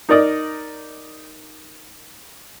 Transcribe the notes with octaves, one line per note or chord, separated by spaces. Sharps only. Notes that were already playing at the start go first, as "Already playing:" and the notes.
D#4 A#4 D5 D#5